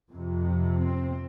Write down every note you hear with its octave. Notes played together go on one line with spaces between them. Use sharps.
F2 C3
C4